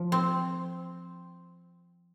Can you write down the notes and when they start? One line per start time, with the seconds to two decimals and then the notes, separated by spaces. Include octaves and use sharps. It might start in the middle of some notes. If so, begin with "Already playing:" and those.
Already playing: F3
0.12 C4